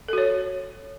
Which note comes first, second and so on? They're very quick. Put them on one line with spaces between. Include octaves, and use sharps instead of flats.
A4 F#4 C#5